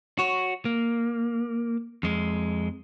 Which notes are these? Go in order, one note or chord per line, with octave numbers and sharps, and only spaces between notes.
F#4 C#5
A#3
F2 G#3